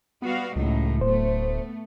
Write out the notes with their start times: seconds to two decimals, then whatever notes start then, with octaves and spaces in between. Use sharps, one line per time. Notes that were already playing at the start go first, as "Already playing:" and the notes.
0.22 G3 B3 F#4 F5
0.56 C#2 A2 F#3 D#4
1.01 D1 A3 B3 C5